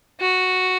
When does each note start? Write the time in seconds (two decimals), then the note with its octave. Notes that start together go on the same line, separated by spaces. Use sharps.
0.20 F#4